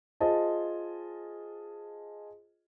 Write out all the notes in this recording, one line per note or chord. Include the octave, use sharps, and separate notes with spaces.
F4 G#4 C5 D#5 A5